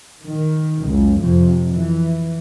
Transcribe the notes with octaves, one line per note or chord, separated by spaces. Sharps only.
D#3
F#1 C#2
F2 C3
E3